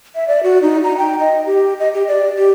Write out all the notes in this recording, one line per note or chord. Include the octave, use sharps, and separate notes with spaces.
E5
D5
F#4
D#4
A#5
G5
D#5
G4
D#5
G4
D5
G4